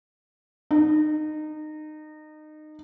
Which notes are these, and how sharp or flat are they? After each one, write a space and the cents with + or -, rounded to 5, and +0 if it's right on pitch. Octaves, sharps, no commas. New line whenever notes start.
D#4 -25